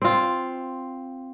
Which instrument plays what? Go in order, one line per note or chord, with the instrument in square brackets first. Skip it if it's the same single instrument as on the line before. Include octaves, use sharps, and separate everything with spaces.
[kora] C4 F4